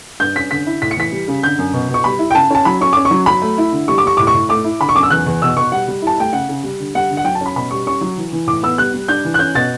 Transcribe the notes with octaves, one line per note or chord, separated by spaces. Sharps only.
G2 G6
C#4 B6
D3 B6
E4
A2 B6
C#7
E3 B6
G3
C#3
D3 G6
F#2
B2
B2
C#6
G3 B5
E4
G5
C#3 A5
C#4 A5
F#3 B5
C#4 C#6
C#4 D6
C#6
F#3
F#3 B5
A3
E4
D3
G3 C#6
D6
G3 C#6
A2 D6
C#6
A2
A3 D6
E4
D3 B5
C#6
F#2 D6
E6
E2 F#6
E2
B2 E6
B2 C#6
G3 F#5
G3
E4 A5
A3 G5
C#3 F#5
C#3
G3
D3
G3 F#5
D3
F#5
F#3 G5
A5
C#4 B5
B2 B5
G3 C#6
C#4 C#6
F#3
E3
E3
A2 D6
B3 E6
G3 F#6
G3
D4 G6
E3
F#6
C#4 G6
B2 A6